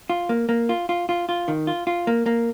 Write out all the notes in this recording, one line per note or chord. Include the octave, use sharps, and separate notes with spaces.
F4
A#3
A#3
F4
F4
F4
F4
D#3
F4
F4
A#3
A#3